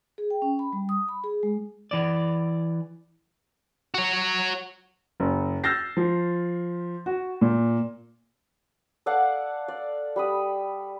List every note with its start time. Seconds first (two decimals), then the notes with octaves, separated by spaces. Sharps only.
0.18 G#4
0.30 G5
0.42 C#4
0.59 B5
0.73 G3
0.89 D#6
1.09 B5
1.24 G#4
1.43 G#3
1.91 E3 D5
3.94 F#4 C#5
5.20 F#1
5.64 E6 F6 G6 A6 A#6 C7
5.97 F3
7.06 F#4
7.41 A#2
9.06 A4 D5 F5 F#5
9.68 D5
10.16 G3 B5 D#6